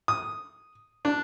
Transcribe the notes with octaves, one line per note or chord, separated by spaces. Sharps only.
D#6
D4